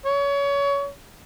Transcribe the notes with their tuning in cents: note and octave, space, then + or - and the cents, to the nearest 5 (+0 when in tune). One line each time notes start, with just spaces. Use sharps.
C#5 +25